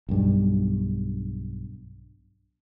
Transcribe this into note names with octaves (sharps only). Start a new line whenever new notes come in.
B1 G2